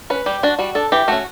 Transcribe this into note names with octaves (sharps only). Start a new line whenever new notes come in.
C#4 B4
G3 G4
D4 F#4
G3 F#4
D4 A4
E3 G4
A3 C#4 F#4